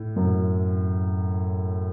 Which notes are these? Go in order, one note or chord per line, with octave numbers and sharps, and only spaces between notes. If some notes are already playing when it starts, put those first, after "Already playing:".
Already playing: A2
F#2